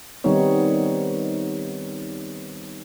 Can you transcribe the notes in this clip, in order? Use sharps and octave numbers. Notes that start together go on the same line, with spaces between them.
D#3 G3 B3 C4 D#4 C#5